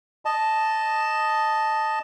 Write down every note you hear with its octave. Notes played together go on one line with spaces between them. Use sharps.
D#5 A5